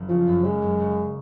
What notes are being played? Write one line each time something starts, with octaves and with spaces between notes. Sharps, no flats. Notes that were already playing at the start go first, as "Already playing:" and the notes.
Already playing: F#1
C#3 F3
F#2
F#1 G#3
F#1
C#3